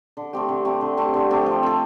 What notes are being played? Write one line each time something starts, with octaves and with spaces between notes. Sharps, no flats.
D3
A3 C4 G4
D3
A3 C4 G4
D3
A3 C4 G4
D3
A3 C4 G4
F3
C4 A4